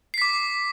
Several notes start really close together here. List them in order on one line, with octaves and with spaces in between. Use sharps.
C7 B6 D6